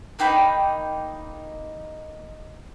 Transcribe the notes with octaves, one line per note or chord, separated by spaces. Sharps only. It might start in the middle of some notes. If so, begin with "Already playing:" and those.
A#3 D#4 G5 B5